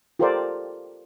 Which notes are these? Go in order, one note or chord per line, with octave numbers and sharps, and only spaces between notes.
F4 G4 A4 A#4 C5 D5